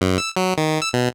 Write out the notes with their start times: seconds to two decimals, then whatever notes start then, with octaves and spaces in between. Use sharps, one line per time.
0.01 F#2
0.18 E6
0.37 F#3
0.58 D#3
0.82 E6
0.93 B2